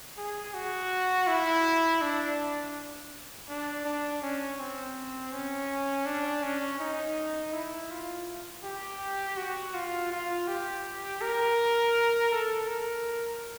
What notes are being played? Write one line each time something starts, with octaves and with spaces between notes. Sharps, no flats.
G#4
F#4
E4
D4
D4
D4
C#4
C4
C#4
D4
C#4
D#4
E4
F4
G4
F#4
F4
F4
G4
A#4
A4
A#4